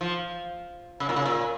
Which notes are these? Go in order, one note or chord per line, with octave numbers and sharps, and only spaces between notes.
F3
C#3
A#2
C#3
A#2